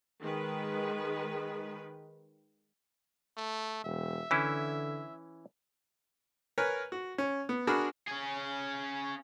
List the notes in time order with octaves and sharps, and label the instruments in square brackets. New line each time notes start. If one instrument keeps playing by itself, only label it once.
[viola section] D#3 G#3 B4
[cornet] A3
[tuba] E1 [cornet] E5
[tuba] D3 [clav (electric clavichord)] E3 C#4 E4
[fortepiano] A#4 B4 C#5 G#5
F#4
C#4
B3
D4 F#4 G#4 A#4 B5
[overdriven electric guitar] C#4 G#4